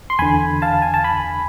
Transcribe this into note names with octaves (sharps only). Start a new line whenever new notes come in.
C6
E2 D3 G#5 B5
F5 A5
G#5
A5
G#5 B5